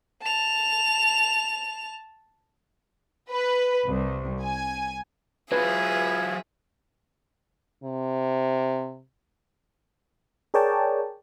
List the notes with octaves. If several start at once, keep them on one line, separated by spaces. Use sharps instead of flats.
A5 F7
B4
C2
G#5
F#3 F4 G#4 B4 E5 G#6
C3
G#4 A#4 C#5 D5 G5 A5